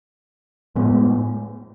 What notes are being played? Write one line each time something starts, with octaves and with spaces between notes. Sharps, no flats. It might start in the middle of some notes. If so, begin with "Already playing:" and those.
A2 G#3 B3